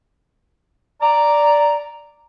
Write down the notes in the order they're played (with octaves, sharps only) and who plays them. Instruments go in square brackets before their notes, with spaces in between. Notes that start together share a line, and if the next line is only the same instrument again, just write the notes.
[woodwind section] D5 A#5